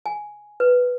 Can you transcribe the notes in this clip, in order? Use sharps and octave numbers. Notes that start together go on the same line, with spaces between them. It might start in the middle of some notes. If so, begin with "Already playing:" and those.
G#5
B4